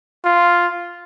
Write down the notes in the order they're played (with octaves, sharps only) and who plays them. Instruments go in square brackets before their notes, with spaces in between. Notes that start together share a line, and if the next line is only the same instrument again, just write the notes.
[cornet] F4